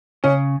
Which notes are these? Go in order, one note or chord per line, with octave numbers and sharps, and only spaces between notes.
C#3 C#4